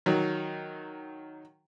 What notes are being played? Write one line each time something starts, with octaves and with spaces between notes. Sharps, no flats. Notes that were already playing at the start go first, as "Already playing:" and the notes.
D#3 F#3